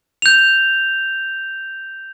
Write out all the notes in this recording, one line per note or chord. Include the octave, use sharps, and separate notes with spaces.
G6 F7